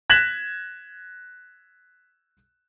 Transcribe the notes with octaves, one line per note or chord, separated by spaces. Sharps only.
F#6 G#6 A#6 B6 E7 F#7